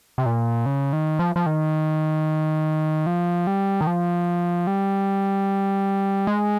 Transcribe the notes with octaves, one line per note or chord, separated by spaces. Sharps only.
C3
A#2
C#3
D#3
F3
F3
D#3
F3
G3
D#3
F3
G3
G#3